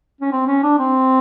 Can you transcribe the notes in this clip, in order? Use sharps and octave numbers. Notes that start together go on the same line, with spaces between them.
C#4
C4
C#4
D4
C4